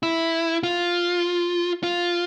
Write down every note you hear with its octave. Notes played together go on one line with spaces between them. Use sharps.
E4
F4
F4